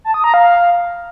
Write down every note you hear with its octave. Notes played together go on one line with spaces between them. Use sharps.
A5
D#6
A#5
F5